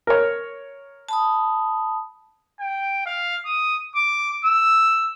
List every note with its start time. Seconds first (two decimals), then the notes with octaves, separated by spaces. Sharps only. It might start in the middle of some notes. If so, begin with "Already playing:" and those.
0.07 A#4 C#5
1.09 A5 B5 D#6
2.60 G5
3.06 F5
3.45 D#6
3.96 D6
4.45 E6